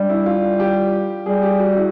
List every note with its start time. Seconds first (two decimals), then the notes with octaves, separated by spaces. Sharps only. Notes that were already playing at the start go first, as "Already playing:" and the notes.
Already playing: G3 D4
0.09 E4
0.26 F4
0.60 G4
1.26 G3 G#4
1.43 G4
1.60 F#4
1.76 E4